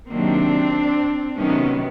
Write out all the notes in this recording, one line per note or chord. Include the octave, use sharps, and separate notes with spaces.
C3 D#3 F#3 A#3 C4 D4
C3 D#3 F#3 B3 C#4